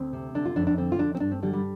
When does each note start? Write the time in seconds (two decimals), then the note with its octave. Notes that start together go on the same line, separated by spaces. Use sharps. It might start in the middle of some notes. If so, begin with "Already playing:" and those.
Already playing: D2 C4
0.13 C3
0.35 D3 D4
0.45 F4
0.56 F2 D4
0.67 D4
0.78 D3 C4
0.92 F4
0.99 F2 D4
1.15 C4
1.20 G2 D4
1.32 C4
1.43 D3 G3
1.53 G3